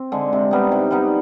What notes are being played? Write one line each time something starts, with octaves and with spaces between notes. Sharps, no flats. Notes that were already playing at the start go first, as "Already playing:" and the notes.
Already playing: C4
D3 G#3
C3
G3 B3 D#4
C3
G3 B3 D#4